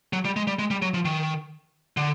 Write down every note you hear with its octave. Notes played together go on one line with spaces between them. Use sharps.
F#3
G3
G#3
G3
G#3
G3
F#3
F3
D#3
D3